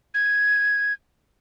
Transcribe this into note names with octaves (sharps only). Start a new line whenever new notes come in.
G#6